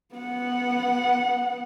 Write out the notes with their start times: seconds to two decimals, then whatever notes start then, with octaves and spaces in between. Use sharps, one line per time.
0.15 B3 F#5